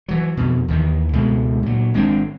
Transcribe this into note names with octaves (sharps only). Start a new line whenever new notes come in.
E3 F#3
F2 B2
D#2 D#3 E3
C#2 B2 G#3 A3
A#2 F#3
G#1 G#3 C4 D4